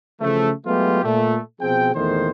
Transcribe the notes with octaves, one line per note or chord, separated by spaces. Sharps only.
C#3 E3 F3 A3
F#3 G#3 A3 B3 F4 G4
A#2 A3
B2 F3 C4 G#4 G5
E2 A#2 D#3 A3 C5